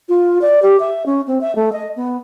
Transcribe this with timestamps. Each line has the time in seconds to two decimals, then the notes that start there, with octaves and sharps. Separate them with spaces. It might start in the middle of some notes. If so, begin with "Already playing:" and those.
0.09 F4
0.42 D5
0.62 G4
0.80 E5
1.06 C#4
1.27 C4
1.41 E5
1.56 A3
1.72 D#5
1.96 B3